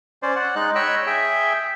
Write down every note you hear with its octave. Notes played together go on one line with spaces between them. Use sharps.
C#4 C5 D5
D5 F#5
G#3 D#4 F#6
C#5 D#5 G5 B5 E6 F#6
G#4 E5 G5